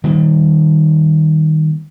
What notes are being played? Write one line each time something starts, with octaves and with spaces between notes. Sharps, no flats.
D#3 G3 A#3